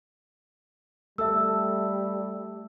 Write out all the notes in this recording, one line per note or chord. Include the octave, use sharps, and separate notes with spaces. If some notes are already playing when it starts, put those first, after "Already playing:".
G3 A3 A4 E5 E6